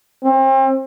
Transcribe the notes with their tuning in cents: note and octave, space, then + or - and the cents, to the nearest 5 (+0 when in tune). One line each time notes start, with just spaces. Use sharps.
C4 +35